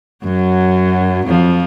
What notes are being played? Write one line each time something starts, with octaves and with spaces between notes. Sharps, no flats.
F#2 F#3
F2 F3